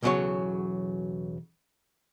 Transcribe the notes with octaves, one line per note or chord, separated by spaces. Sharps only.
B1 E2 C#3 F#3 F#4 C#5